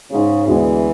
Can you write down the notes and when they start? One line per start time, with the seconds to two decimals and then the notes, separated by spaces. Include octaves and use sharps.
0.10 G#2 C#3 G#3 C#4
0.47 D2 D3 E3 G#3 B3 D4